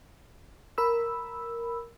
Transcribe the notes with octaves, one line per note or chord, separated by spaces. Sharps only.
A#4 B5 E6